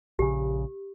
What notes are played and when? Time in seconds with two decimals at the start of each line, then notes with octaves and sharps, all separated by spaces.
0.19 A#1 C#3 G4